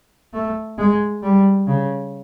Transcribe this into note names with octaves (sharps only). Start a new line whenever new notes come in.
A3
G#3
G3
C#3